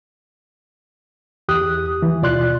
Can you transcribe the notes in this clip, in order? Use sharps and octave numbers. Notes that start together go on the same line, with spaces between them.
E2 G4 D#6 F#6
E3
D#2 B2 F4 D5 C6 F#6